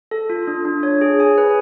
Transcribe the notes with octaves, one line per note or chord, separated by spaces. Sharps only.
A4
F4
D4
D4
C#5
G#4
G#5
B4